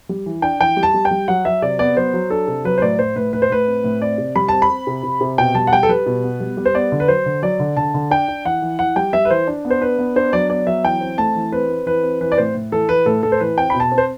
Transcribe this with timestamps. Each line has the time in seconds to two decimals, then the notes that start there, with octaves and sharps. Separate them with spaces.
0.09 G3
0.26 E3
0.42 D4 G5
0.60 E3 G5
0.77 G3
0.83 A5
0.94 G3
1.05 G5
1.11 G3
1.28 F#3 F#5
1.45 F#3 E5
1.62 C3 D5
1.79 B3 D5
1.97 F#3 C5
2.14 F#3
2.30 D4 A4
2.48 C3
2.65 F#3 B4
2.78 C5
2.82 A2 D5
2.99 A2 C5
3.16 A2 B4
3.33 A2 B4
3.42 C5
3.50 A2 B4
3.67 C4
3.84 A2
4.01 C4 D5
4.18 C3
4.36 G3 B5
4.48 C4 A5
4.62 B5
4.70 C4
4.87 C3
5.03 C3
5.21 C3
5.38 B2 G5
5.55 G3 A5
5.67 F#5
5.72 G3 G5
5.83 A4
5.89 G3 B4
6.06 B2
6.24 B3
6.40 G3
6.57 G3
6.65 C5
6.74 B3 D5
6.92 D3
7.00 B4
7.08 F#3 C5
7.26 D3
7.42 F#3 D5
7.60 D3
7.77 D3 A5
7.94 D3
8.11 D4 G5
8.28 D4
8.45 E3 F#5
8.62 E3
8.79 E3 F#5
8.96 G3 G5
9.13 G3 E5
9.25 B4
9.30 E3 C5
9.47 D4
9.65 B3
9.70 C5
9.81 D4 B4
9.99 B3
10.16 D4 C5
10.33 F#3 D5
10.50 B3 D5
10.67 F#3 E5
10.84 E3 G5
11.01 C4
11.18 A3 A5
11.35 E3
11.52 C4 B4
11.69 C4
11.86 E3 B4
12.03 C4
12.21 E3 B4
12.32 D5
12.38 A2 C5
12.55 A2
12.72 E3 A4
12.89 E3 B4
13.06 A2 A4
13.23 A2 A4
13.32 C5
13.40 E3 B4
13.58 C4 G5
13.70 B2 B5
13.80 A5
13.92 C4
13.98 C5